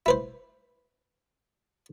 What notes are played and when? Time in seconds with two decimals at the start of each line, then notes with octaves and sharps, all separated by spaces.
0.06 E4 B4 C5